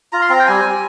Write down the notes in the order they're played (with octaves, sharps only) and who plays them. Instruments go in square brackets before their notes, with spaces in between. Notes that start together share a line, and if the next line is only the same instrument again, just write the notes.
[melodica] F4 A#5
C6
C4 A#5
G5
G3 G#5
G3